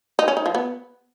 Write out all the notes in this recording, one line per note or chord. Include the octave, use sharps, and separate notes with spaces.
D#4
C#4
D#4
F3
B3